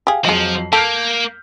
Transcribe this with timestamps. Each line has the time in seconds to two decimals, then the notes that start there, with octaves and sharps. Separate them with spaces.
0.07 G4 G#4 F5
0.25 F2 F3 F#3 G#3 F#4 D#5
0.73 A#3 A4 F6 G6 B6